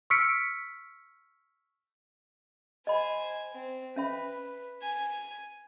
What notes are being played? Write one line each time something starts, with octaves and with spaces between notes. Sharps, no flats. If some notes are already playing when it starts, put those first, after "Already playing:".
C#6 E6 F6 B6 C#7 D7
C5 D#5 G#5 B5
C4
C#4 B4 E5 B5
G#5